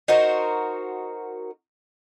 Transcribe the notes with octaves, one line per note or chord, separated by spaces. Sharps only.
D#4 F#4 A#4 C5